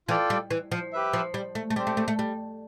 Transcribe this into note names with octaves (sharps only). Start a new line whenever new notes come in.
E3 F4 A4 D5 G5
G3
E3
F3
G4 B4 E5
F3
G3
A3
A3
G3 C4 G4 C5
A3
A3
A3
G3